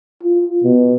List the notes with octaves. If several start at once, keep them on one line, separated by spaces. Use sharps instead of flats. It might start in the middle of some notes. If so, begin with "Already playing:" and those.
F4
B2